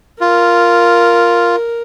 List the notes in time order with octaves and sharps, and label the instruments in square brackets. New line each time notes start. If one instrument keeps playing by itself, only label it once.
[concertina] F4 [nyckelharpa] A#4